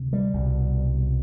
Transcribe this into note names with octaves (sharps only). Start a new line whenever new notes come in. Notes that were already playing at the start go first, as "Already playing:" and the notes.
Already playing: D2 C3
G3
C2 B2